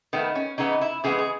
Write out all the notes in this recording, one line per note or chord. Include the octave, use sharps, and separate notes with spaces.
D#3 A3 B3
C#4
C#3 E3 B3 D#4
E4
C#3 E3 G#3 B3 G#4
G#4